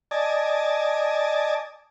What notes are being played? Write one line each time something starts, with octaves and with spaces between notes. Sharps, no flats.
D5 D#5 G#5 A5